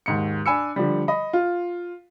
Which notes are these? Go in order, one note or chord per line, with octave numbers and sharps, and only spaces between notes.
D#2 G#2 C#7
D4 G#5 B5 E6 C#7
D3 F3 G3
D#5 B5
F4